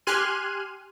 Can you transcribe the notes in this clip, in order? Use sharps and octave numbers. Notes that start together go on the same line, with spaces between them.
G4 G#5 C6 F6 F#6 D#7